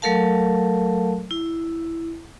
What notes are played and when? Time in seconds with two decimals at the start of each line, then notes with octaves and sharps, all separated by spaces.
0.02 F#3 A3 A4 A#4 F5 A5
1.31 E4